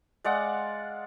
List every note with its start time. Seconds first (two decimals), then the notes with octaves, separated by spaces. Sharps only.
0.24 G#3 D5 F5 F#5